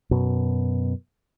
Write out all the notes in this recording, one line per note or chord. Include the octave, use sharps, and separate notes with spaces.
F#2 B2